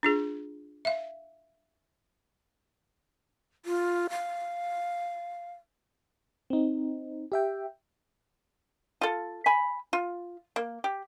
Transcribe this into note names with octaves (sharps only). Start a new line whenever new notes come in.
D4 F4 G#4
E5 F5
F4
F5
C4 D#4
G4 E5 G5
F4 A4
G#5 B5
F4
A#3
G4